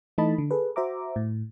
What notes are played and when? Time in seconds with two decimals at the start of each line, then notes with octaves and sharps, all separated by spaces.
0.18 E3 A3 D#4 D#5 A5 B5
0.38 D3
0.51 G#4 A4 B4
0.76 F#4 C5 E5 A#5 D6
1.16 A2